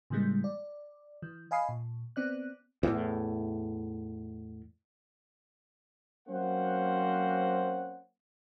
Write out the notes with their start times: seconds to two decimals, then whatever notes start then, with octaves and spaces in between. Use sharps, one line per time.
0.10 A2 C#3 E3 G3 G#3 A#3
0.44 D5
1.22 E3
1.51 D#5 F5 G#5 B5 D#6 C7
1.69 A#2
2.16 B3 C4 D5 F#6
2.83 E2 A2
6.28 F#3 A#3 C4 C#4 C5 F#5